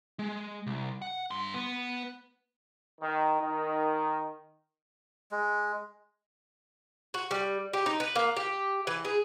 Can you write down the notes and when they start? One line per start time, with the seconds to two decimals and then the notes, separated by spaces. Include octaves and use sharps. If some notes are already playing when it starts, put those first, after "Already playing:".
0.19 G#3
0.67 C2
1.02 F#5
1.31 G2 C6
1.54 B3
3.01 D#3
3.41 D#3
5.31 G#3
7.14 F#4
7.31 G3
7.73 G4
7.86 D#4
8.00 B4
8.15 A#3
8.37 G4
8.87 E3
9.05 G#4